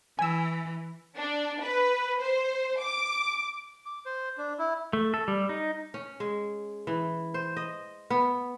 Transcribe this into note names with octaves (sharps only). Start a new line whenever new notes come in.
E3 G#5 E6
D4
B4
C5
D6
D6
C5
D4
E4
A3
A4
G3
D#4
C#4
G#3
E3
C5
D#5
B3